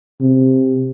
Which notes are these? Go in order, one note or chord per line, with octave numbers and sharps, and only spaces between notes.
C3